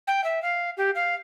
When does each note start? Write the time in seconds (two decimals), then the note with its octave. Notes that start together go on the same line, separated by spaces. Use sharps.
0.07 G5
0.23 E5
0.42 F5
0.77 G4
0.95 F5